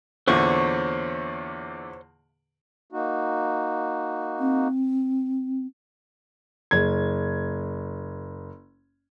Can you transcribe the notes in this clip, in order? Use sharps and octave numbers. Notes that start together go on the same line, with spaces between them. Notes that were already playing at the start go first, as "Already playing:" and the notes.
E2 A#2 D3 C5 C#5 C#6
A#3 D#4 F#4
C4
F#1 G#6